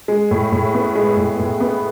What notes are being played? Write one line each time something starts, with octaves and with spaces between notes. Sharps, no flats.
G#3
A2
A2
B3
G#3
A2
A2
B3